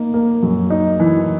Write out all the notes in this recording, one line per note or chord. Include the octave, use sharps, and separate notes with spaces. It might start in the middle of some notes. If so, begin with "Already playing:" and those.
Already playing: A#3 D#4
A#3
F#2
D#4
E3